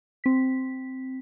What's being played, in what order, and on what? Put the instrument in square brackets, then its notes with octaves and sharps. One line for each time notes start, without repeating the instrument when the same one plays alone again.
[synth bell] C4 B6